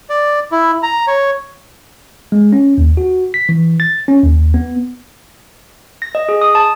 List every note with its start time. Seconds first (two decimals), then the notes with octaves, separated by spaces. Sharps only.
0.10 D5
0.52 E4
0.83 A#5
1.07 C#5
2.32 G#3
2.53 C#4
2.78 D#2
2.97 F#4
3.34 B6
3.49 E3
3.80 A6
4.08 C#4
4.23 D#2
4.54 B3
6.02 A#6
6.15 D#5
6.29 G#4
6.41 D#6
6.55 A5